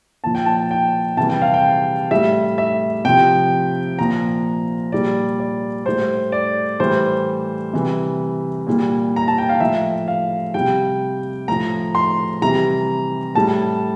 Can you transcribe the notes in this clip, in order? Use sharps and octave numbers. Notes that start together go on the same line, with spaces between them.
A#2 F3 A5
G5
A5
G5
C3 E3 G3 A5
G5
F5
G5
A2 G3 E5
E5
C3 F3 G5
A#2 F3 A#5
A#2 G3 D5
D5
A2 G3 C5
D5
A2 E3 G3 C5
C3 E3 G3
A#2 G3
A#5
A5
G5
F5
A2 F3 E5
F5
C3 G3 G5
A2 F3 A#5
C6
C3 E3 G3 A#5
A2 G3 A5